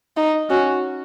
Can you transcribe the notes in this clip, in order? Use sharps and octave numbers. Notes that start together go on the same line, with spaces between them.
D#4
C#4 F#4